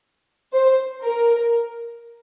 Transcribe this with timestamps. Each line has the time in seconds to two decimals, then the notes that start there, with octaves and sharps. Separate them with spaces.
0.54 C5
1.03 A#4